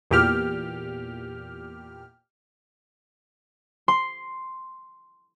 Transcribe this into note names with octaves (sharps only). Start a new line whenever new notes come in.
E2 A#2 G4 F6
C6